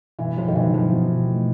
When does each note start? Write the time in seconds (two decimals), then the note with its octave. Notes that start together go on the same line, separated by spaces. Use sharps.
0.19 B2 E3
0.37 F3 F#3
0.48 D#3
0.55 B2 E3
0.74 B2 F3
0.93 B2
1.11 B2
1.29 A3